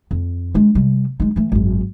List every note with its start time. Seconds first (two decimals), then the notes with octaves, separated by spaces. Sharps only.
0.11 F2
0.54 G#3 D4
0.75 C3 G3
1.20 G#3 D#4
1.36 E3 A3
1.52 G#1 F#2